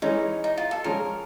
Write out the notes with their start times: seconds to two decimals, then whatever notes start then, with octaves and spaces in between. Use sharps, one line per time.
0.02 E3 G#3 C#4 D#4
0.44 D#4
0.58 F4
0.71 A4
0.84 F3 G#3 C#4 F4 A4 A#4